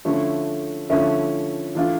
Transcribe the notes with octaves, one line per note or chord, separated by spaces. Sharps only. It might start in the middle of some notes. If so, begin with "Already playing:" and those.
D3 F3 A3 C#4 E4
D3 F3 A3 C#4 E4
E3 A3 D4 F4